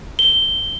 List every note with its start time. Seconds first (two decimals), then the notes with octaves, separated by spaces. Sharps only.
0.19 G7